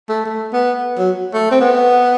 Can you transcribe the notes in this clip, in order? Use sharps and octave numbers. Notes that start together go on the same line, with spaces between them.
A3
A3
B3
F#3
A3
C4
B3